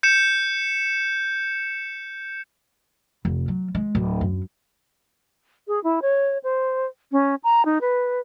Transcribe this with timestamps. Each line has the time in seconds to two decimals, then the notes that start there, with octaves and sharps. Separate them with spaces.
0.03 G6 C#7 E7
3.25 F1
3.48 F#3
3.75 G#3
3.95 D1
4.21 F#2
5.68 G#4
5.84 E4
6.02 C#5
6.43 C5
7.12 C#4
7.44 A#5
7.65 D#4
7.81 B4